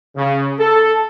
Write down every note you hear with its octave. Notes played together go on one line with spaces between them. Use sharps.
C#3
A4